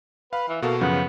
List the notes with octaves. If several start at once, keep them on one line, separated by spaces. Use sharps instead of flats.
B4 F5
E3
B2 A#3 F#4 A4
F#2 C#3 F3 B3